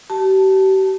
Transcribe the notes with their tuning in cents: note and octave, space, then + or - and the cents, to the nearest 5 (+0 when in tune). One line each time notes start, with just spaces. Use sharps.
G4 -40 A5 -5